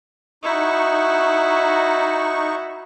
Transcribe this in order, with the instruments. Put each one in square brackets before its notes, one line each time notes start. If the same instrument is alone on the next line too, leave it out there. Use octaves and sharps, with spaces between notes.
[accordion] D#4 C#6 [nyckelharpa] E4 F#4